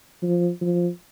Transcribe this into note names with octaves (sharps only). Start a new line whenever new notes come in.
F3
F3